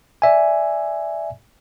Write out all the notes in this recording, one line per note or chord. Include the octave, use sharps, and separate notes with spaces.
D5 E5 G#5